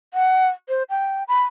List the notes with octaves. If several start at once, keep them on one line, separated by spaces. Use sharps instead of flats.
F#5
C5
G5
B5